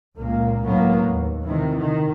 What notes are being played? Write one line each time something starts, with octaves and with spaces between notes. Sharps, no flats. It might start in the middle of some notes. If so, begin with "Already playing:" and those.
C#2 A#2 A#3
C#2 A2 F#3 A#3 B3
D#2
C3 D#3 E3
D#3